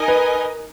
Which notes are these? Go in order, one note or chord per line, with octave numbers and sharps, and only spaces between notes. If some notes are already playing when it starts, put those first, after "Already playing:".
Already playing: D#4 A#4 D#5 G#5
B4